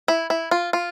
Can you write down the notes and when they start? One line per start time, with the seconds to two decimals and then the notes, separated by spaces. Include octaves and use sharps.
0.08 E4
0.30 E4
0.51 F4
0.73 F4